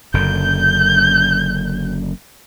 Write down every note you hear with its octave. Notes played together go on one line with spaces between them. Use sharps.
F#1 F#2 D3 G6